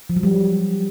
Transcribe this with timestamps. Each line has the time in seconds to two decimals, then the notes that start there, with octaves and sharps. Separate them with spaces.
0.10 F3
0.16 F#3
0.23 G3